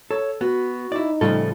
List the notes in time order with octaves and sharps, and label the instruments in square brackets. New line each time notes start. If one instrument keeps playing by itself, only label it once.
[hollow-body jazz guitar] A4 [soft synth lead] C#5
[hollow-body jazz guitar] B3 [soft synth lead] F#4
[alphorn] D#4 [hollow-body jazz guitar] E4 D5
[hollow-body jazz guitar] A2 C#3 F3 [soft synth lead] G3 [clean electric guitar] F4 A4